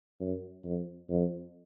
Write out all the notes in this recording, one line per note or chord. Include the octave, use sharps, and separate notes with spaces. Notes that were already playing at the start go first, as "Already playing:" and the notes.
F#2
F2
F2